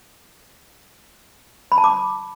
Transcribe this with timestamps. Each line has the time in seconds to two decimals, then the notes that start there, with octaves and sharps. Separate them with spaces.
1.72 B5
1.78 A5
1.84 D6